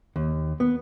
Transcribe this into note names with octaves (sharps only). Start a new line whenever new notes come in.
D#2
B3